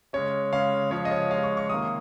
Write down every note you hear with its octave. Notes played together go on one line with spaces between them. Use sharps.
C#3 G#3 C#4 C#5
C#3 G#3 C#4 F5
C#3 F3 G#3 C#5
D#5
C#5
C#3 F3 G#3 F5
C#6
C#6
C3 D#3 A#3 D#6